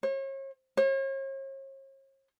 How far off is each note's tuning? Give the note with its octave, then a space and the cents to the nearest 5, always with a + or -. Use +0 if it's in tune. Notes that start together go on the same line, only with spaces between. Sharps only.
C#5 -40
C#5 -45